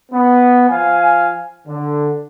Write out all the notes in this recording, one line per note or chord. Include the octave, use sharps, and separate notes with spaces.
B3
F3 F5 G#5
D3